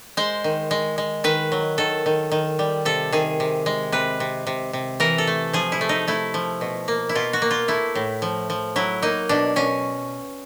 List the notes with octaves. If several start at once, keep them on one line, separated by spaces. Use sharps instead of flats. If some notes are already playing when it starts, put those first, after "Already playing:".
G#3 C5
D#3
G#3
G#3
D#3 B4
F#3
D#3 A4
D#3
D#3
G3
C3 A4
D#3 G#4
C3
G#3
C3 B4
C3
C3
C3
E3 A#4
A4
A3
F3 G#4
E4
A3
D#4
A3 E4
F3
B2
A#3
E4
B2 F4
F#4
A#3
F4
A3 E4
A2
F3
F3
F#3 E4
A#3 D#4
B2 D4
B2 C#4